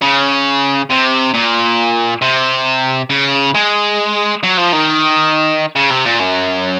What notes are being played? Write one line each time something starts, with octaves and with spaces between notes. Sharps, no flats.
C#3
C3
A#2
C3
C#3
G#3
F#3
F3
D#3
C#3
C3
A#2
F#2